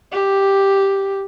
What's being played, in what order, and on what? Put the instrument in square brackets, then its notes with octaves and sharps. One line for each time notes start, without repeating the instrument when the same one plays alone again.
[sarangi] G4